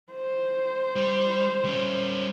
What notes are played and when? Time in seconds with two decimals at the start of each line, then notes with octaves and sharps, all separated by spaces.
0.12 C5
0.96 G3
1.65 G3 C#4